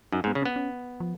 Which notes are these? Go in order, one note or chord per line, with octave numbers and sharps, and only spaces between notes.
F#2 D#4
G#2
B3
C#3
C#4
B3
C#4
F3